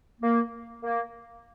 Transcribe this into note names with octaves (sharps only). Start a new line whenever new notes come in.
A#3
A#3